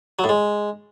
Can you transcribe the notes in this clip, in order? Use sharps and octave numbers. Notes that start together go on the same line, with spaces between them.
F#3
A2
G#3